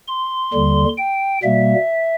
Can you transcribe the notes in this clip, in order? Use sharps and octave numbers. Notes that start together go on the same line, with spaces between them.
C6
D#2 D3 G3
G5
B2 G3 A#3 E5